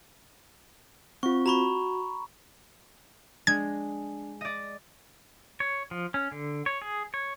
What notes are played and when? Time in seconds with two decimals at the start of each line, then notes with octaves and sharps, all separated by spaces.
1.23 C4 F4 C#6
1.46 F#4 A#5 B5 C#6
3.47 G#3 D4 G#6
4.41 D5 D#5
5.60 C#5
5.91 F3
6.14 C#4
6.32 D3
6.66 C#5
6.82 G#4
7.14 C#5